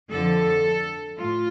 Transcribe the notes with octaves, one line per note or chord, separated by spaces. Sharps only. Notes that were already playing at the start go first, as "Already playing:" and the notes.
F2 D3 F3 A4
A2 F4